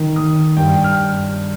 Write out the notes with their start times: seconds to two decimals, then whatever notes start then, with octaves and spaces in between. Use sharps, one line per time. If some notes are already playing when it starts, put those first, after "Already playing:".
Already playing: D#3
0.16 D#3 D#6
0.57 G2 G5
0.84 F6